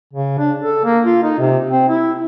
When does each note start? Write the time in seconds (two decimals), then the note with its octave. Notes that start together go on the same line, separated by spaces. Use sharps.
0.13 C#3
0.38 D4
0.62 A4
0.85 A#3
1.05 F4
1.23 D#4
1.39 C3
1.70 C4
1.89 E4